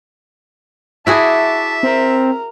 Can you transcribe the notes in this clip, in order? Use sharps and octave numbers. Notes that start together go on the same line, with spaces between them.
E4 F#4 G#4 E5 A5 D6
C4 A#4